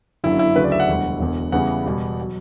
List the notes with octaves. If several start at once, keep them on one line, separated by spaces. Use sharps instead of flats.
G1 F#2 D3 F#3 E4
E4
D2 C#3 F#3 B4
D5
E5
F#5
E1 D2 D3 G3
E1 E2 D3
E2 C#3 E3 G3 F#5
E1 E2 B2 G3
F#3